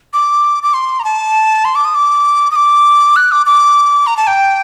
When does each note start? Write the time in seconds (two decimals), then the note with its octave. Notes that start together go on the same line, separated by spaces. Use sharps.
0.13 D6
0.63 D6
0.74 C6
1.00 A#5
1.04 A5
1.65 C6
1.75 D6
1.85 D#6
1.95 D6
2.51 D#6
2.56 D6
3.16 F#6
3.32 D6
3.46 D6
4.07 A#5
4.17 A5
4.27 G5